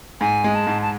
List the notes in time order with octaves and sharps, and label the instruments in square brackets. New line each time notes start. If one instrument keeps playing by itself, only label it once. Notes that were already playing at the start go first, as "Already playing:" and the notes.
[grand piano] G#2 [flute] G#5
[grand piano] G#3
[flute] A5
[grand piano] G#2
[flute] A5